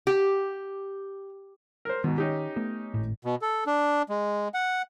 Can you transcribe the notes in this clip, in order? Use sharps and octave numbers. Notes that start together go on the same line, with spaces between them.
G4
A#4 C5
G#2 B2 D#3
C#4 D#4 G4
A3 B3
G#1 A2
B2
A4
D4
G#3
F#5